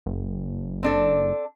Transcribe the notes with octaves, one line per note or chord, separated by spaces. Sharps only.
F#1
C4 D4 A4